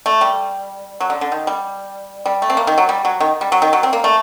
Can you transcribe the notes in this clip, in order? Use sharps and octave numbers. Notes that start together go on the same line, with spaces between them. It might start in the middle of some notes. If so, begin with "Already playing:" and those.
A3
G3
F#3
D3
D3
D#3
G3
G3
A3
C4
A#3
D#3
F#3
G3
F#3
D#3
G3
F#3
D#3
F#3
C4
A#3
A3